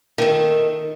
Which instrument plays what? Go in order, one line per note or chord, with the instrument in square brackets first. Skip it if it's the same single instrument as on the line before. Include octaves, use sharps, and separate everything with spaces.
[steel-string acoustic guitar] D#3 A3